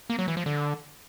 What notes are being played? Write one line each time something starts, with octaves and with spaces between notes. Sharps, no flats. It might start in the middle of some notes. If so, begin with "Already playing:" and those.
A#3
F#3
E3
F3
D3